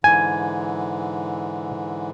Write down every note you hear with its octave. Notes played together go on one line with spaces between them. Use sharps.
G#2 D3 E3 G#5